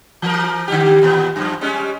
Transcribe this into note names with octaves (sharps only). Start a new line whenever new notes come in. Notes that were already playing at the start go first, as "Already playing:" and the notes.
E3 A#4
D3 G3 G4
D#2 A#2 B3
F#2 F3
G3 G#3 C#4